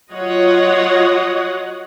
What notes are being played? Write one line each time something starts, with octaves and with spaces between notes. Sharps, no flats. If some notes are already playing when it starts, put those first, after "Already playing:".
F#3 F4 C#5 D#5 F#5